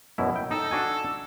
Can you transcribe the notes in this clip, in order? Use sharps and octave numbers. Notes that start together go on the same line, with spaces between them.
F#2 B2 E4
G5
D#4 A4
D4 F#4 G#5